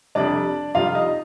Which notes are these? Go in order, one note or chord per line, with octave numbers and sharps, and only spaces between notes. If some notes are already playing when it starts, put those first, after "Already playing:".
F2 C3 G3 D4 D5
F2 C3 G3 F4 F5
D#4 D#5